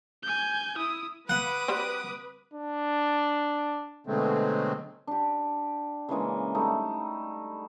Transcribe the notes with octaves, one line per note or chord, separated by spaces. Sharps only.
G#5 G6
E4 D#6
B4 F#5 D6 D#6
G3 C4 F#4
D4
B2 D3 F#3 G#3 A3 C4
D4 G4
C#3 E3 G#3 A#3
G3 A3 D#4